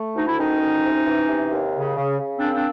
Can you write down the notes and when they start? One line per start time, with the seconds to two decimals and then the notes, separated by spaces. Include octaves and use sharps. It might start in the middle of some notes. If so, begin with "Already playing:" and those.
Already playing: A3
0.15 D2 D#4
0.26 E4
0.37 D#3 C#4 D#4
0.61 D2
0.84 C3
1.06 E3
1.29 C3
1.52 D#2
1.75 C#3
1.97 C#3
2.20 C#3
2.37 C4 D4
2.42 A#3
2.54 C4 D4